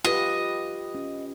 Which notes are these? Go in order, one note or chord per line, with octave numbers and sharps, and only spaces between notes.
F4 G4 B4 D#5
C#4